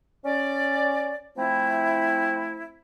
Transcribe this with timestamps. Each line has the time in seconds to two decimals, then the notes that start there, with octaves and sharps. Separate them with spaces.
0.25 C#4 D5
1.37 F3 A3 C4 E4